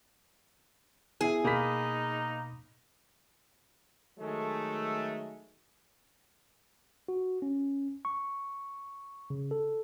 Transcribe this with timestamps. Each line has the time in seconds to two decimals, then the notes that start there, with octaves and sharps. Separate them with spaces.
1.21 B3 E4 G#4 E5
1.45 B2 A#3 D#4 B5 B6
4.19 D#3 F#3 G#3 A3
7.08 F#4
7.42 C#4
8.05 C#6
9.30 C#3
9.51 A4